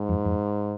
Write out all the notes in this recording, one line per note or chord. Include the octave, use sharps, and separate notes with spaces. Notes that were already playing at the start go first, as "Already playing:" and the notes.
Already playing: G#2
F2
F2